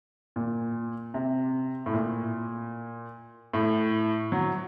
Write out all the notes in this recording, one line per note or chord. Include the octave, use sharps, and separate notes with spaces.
A#2
C3
A2
A#2
A2
F#3